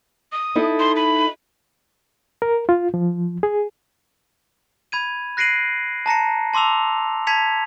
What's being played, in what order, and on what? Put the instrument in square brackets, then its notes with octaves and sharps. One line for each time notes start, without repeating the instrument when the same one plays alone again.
[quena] D#6
[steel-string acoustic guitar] D#4 E4 A4
[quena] C6
B5
[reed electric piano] A#4
F4
F3
G#4
[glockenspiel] B5 G#6 D#7
F#6 A#6 C7 D7 D#7 F#7
A5 A#5 A#6 C#7
A5 C6 D6 E6 F7
A5 G#6 B6 C#7 F7